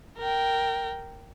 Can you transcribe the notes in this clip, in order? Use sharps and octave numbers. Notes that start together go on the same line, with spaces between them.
A#4 G5